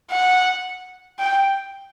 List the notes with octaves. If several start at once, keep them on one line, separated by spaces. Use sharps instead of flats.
F#5
G5